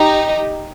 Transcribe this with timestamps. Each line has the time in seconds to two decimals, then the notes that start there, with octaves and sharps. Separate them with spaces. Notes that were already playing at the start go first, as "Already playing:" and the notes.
Already playing: D#4 G4